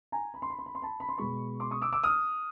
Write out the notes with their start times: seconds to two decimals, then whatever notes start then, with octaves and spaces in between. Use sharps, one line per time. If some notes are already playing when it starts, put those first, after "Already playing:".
0.12 G#5 A#5
0.34 B5
0.42 C6
0.50 B5
0.59 C6
0.66 B5
0.75 C6
0.82 A5 B5
1.00 B5
1.09 C6
1.18 B2 G#3 B3 B5 C#6
1.60 C6 D6
1.71 C#6 D#6
1.82 D6 E6
1.93 D6 E6
2.03 D#6 F6